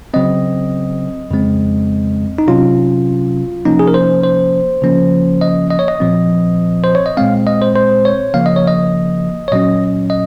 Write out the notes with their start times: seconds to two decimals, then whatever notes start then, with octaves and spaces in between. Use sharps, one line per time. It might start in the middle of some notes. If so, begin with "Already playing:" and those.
0.14 C#3 F#3 C4 D#5
1.31 F2 C#3 G#3 C4
2.38 D#4
2.48 C3 F#3 C#4 F4
3.65 C3 F3 A#3 C#4 D#4
3.79 G#4
3.88 A#4
3.94 C5
4.23 C5
4.82 C#3 F3 A#3 C#4
5.41 D#5
5.70 D#5
5.79 C#5
5.88 D#5
6.00 A#2 F3 C4
6.84 C5
6.95 C#5
7.06 D#5
7.17 A#2 G#3 C4 F5
7.47 D#5
7.62 C5
7.76 C5
8.05 C#5
8.34 C#3 F3 A#3 F5
8.46 D#5
8.56 C#5
8.68 D#5
9.48 C#5
9.52 A#2 F#3 C#4 D#5
10.10 D#5